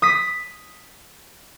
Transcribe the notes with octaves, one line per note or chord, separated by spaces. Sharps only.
D#6 B6